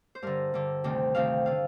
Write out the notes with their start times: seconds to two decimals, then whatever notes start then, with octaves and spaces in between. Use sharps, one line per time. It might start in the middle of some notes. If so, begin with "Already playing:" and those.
0.15 C5
0.22 G2 D3 A#4
0.54 G2 D3
0.84 D2 C3 D#3
1.15 D2 C3 D#3 F5
1.46 D3 F5